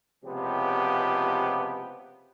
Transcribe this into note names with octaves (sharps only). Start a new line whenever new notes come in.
C#2 C3 F3 B3 G4